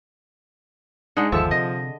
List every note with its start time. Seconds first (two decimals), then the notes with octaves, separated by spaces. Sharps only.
1.17 G#2 G#3 D4 D#4 G#4 F#5
1.32 G1 D#2 D3 F3 E5 A5 C#6 E6
1.51 C3 D#5